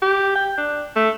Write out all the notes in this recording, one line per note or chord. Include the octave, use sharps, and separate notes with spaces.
G4
G5
D4
A3